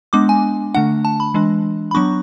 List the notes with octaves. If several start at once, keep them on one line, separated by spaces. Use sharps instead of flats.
G#3 B3 D4 D6
G#5
D3 A3 D4 F#5
A5
B5
E3 G#3 D4
B5
F#3 B3 D4 C#6